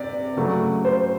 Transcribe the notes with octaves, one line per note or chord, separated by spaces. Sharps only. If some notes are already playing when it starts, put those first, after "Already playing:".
Already playing: C3 D5
C#3 F#3 A3
C5